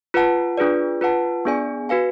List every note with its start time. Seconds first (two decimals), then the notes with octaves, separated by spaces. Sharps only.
0.14 F4 B4 F#5 A5
0.57 D4 F4 G#4 B4 D5
1.01 F4 B4 F#5 A5
1.45 B3 D4 G#4 D5 G#5
1.89 F#4 B4 F5 G#5